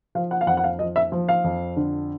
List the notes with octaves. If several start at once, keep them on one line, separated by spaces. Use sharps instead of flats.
F3 F5
F#5
F5
F2 F#5
F#5
F5
F3 D#5
E5
F3
F5
F2
D3